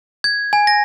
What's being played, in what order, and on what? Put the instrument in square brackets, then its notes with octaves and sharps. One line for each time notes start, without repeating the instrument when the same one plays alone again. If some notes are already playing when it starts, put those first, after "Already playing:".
[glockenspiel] G#6
G#5
A#6